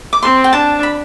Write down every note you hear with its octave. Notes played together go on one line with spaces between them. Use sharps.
D6
C4 C6
G5
D4 A5
B5